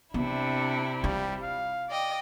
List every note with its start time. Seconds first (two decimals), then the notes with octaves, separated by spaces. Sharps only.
0.14 C3 B3 D4 E4
1.04 G3 F4
1.43 F5
1.89 D5 D#5 G5